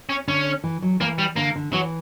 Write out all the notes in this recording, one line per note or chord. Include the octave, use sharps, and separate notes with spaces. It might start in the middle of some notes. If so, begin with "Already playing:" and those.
C#4
D3 C#4
E3
F#3
E3 A#3
G3
D3 A#3
D3
E3 F#3